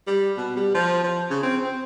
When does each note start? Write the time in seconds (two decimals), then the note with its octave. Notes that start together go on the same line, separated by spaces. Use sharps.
0.07 G3
0.37 B2
0.56 G3
0.74 F3
1.04 F3
1.30 C#3
1.43 C4
1.64 C4